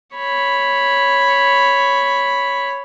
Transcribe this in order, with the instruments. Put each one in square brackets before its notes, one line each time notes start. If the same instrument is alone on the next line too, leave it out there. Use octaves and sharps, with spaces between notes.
[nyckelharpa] C#5 B5